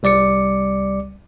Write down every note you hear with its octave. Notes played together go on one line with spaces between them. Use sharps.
C2 G3 D5 D6 C#7